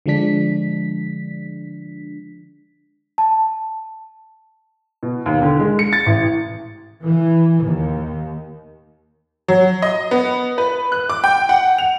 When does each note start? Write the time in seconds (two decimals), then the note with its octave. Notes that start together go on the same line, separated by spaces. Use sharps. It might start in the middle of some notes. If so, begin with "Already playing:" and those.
0.06 D3 F3 G#3 D4 B6
3.18 A5
5.03 B2
5.26 D#2
5.42 D3
5.59 G#3
5.79 C#7
5.93 A6
6.06 A1
7.05 E3
7.63 D#2
9.48 F#3
9.82 D#5
10.11 B3
10.58 B4
10.92 F#6
11.10 D6
11.24 G5
11.49 F#5
11.78 F7